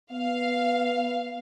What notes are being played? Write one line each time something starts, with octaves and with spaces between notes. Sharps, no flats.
B3 F5